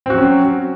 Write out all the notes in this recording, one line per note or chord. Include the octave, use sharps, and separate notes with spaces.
F#3 C4 C#4 F#4